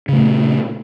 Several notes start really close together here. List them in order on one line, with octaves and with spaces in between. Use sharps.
C#3 A3 A#2